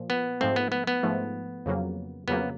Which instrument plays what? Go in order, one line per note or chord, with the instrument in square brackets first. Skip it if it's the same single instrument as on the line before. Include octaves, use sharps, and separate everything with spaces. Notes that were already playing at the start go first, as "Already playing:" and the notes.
Already playing: [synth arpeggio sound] A#2 F3
[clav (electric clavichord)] B3
[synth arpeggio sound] G#2 F3 A3 [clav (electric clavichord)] C4
[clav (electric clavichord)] B3
B3
B3
[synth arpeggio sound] G#2 F3 A3
F2 C#3 F#3 A#3
[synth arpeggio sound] F2 C#3 F#3 A#3 [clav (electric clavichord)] B3